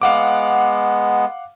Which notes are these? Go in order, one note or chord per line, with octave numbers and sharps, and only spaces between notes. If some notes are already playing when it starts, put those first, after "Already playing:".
G#3 B3 F5 F#5 D6